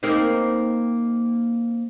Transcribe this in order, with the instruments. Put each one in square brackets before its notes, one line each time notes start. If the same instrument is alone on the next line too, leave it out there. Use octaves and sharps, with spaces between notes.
[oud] A#3 C4 D#4